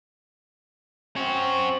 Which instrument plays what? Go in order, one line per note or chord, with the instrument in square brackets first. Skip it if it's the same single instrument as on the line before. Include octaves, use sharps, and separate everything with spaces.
[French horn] C4 [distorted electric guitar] C#4 F#4